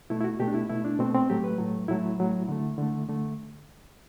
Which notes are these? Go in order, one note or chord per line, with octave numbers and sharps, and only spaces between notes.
B2 A3 E4
E4
F#4
B2 A3 G4
D4
E4
B2 A3 E4
D4
B2 A3 C4
C4
A2 F#3 A3 G4
B4
A2 F#3 A3
A2 F#3 A3 E4
A2 F#3 A3
D3 A3
D3 A3
D3 A3